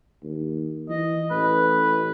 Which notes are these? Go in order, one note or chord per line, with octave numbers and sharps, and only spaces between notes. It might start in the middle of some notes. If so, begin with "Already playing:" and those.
D#2
E3 D#5
A1 B4